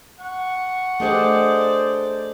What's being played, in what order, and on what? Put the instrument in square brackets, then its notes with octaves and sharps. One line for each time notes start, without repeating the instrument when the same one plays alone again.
[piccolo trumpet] F#5 [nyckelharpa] C#6
[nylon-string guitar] A3 G4 G#4 [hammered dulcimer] D4 D#5 G5 [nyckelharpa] C5 D5